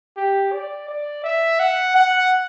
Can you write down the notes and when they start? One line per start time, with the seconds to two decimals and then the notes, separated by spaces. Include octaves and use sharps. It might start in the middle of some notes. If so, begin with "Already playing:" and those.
0.17 G4
0.53 D5
0.88 D5
1.24 E5
1.59 F#5
1.95 F#5